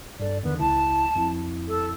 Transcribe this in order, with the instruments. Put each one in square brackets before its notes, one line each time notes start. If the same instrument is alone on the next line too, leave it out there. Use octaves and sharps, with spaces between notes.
[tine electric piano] G2 A4 [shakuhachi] D5
[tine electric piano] E2 D3 D#3 [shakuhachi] B3
[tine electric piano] C#2 E4 [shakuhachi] A5
[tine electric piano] F2 E4
[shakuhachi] A4